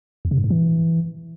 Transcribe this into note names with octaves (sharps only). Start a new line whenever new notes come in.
E2
C3
G2
G#2
E3